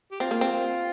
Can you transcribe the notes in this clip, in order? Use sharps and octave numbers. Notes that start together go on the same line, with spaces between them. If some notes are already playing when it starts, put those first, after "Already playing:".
G4
C4 F4
A#3
C4